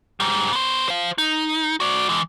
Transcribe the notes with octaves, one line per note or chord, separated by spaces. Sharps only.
G#2 G3
B3 C5
C5 F5
D#4
F#4 D5
E3 G#3